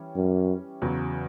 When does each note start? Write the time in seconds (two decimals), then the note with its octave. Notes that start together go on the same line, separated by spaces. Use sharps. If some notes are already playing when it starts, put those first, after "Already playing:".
Already playing: E3 G3 C#4
0.16 F#2
0.82 E2 C#3 F#3